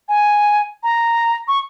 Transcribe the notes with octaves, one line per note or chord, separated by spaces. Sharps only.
G#5
A#5
C#6